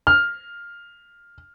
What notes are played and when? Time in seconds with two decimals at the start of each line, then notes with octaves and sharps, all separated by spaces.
0.07 F6